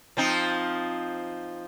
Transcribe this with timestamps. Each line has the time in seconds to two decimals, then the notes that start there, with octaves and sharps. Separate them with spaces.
0.17 F3 C4 D#4